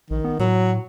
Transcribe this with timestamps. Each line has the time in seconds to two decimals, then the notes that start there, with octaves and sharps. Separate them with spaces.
0.11 A#1 D#3
0.24 B3
0.39 A2 F#3